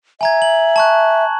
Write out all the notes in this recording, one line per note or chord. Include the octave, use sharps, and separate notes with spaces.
E5 G#5 A#5 G#6
F#7
A5 C#6 F#6